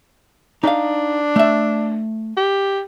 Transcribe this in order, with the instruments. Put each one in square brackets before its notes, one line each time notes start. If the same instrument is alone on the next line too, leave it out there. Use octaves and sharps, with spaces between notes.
[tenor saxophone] D4 [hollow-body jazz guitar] D#4 F5
[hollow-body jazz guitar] A3 E5
[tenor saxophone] G4